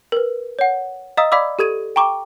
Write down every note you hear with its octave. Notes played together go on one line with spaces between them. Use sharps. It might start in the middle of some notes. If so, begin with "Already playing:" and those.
A#4 B4
C#5 F#5
D#5 F5 A#5 D#6 E6
D5 F5 B5 D6 E6
G4 A4 G#6 D#7
G5 A#5 C#6 D6